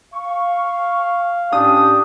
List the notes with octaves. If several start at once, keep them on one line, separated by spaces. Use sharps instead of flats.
F5 C#6
A2 C#4 D4 G4 D#6